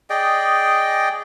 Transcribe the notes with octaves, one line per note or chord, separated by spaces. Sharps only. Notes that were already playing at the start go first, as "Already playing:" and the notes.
G#4 D5 D#5 G5